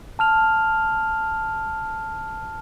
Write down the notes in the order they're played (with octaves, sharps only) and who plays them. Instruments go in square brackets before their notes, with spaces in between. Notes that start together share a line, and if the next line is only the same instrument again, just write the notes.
[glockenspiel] A5 F6 F7